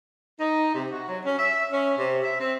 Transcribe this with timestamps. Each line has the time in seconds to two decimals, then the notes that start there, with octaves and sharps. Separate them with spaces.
0.39 D#4
0.75 C3
0.90 F#4
1.08 F#3
1.26 C#4
1.38 E5
1.71 C#4
1.97 C3
2.23 E5
2.39 C4